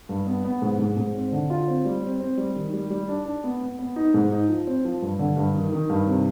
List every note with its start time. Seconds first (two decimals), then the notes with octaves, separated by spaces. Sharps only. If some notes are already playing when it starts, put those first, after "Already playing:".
0.09 G2
0.27 B3
0.45 B3
0.62 G#2
0.79 G#2
0.97 G#2
1.15 C4
1.32 D3
1.50 F4
1.68 C4
1.85 G3
2.03 C4
2.20 C4
2.37 G3
2.55 D#3
2.73 G3
2.90 G3
3.08 D4
3.25 D4
3.44 B3
3.61 B3
3.79 B3
3.96 D#4
4.14 G#2
4.31 D#4
4.49 F3
4.67 C4
4.84 F3
5.02 G2
5.19 D3
5.37 G2
5.54 D#3
5.72 D#3
5.90 G2
6.08 C3